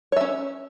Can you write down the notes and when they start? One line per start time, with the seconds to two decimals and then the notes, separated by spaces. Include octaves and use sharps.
0.12 C#5
0.17 E5
0.21 C#4